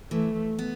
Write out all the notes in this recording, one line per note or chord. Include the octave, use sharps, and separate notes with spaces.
E3 A3
B3